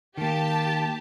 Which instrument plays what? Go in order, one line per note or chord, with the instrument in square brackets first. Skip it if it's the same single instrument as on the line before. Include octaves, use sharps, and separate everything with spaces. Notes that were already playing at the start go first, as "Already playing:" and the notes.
[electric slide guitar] D#3 A#3 [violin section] G4 A5